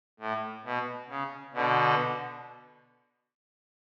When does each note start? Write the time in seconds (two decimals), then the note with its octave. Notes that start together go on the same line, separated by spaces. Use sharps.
0.20 A2
0.65 B2
1.10 C#3
1.54 B2 D3